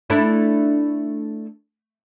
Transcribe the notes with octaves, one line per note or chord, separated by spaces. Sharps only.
A3 D4 E4